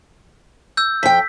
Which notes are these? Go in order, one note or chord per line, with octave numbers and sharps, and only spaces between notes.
E6 G6
F2 G5 B6